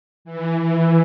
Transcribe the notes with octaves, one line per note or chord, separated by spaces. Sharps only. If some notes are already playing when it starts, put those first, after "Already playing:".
E3
E3